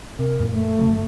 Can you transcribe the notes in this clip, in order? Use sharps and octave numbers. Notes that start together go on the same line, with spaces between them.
C3 A#4
F#2 A#2 E3
A3
E1 C#3 F#3
G1